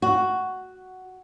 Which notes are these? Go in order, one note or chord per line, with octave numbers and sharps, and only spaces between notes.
F#4